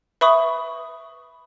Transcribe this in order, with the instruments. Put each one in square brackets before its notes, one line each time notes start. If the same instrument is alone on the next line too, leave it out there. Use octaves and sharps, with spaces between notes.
[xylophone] B4 E5 B5 C#6 D#6